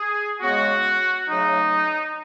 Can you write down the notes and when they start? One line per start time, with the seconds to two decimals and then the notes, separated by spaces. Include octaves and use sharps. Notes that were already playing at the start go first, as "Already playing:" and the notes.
Already playing: G#4
0.41 C#3 G#3 B3 F#4
1.28 C#3 F#3 A3 D#4